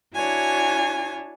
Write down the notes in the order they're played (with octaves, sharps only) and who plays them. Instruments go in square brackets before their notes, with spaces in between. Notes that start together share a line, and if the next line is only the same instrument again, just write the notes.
[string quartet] D4 E4 F#4 C#5 G#5